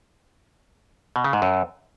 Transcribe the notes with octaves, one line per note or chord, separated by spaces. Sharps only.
B2
C#3
G#2
F#2